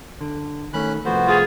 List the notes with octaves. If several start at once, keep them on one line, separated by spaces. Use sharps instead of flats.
D3
D#3 A3 C#4 B5 F#6
C2 F3 A3 B3 F#4 C5
F4 G#4